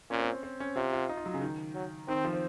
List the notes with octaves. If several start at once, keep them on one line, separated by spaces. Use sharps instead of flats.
A#2 C#4
C4
C#4
C4
C#4
C3 F4
F4
D#4
F4
F#3
C#3
D#3
F#3
D#3 C4
F3
C4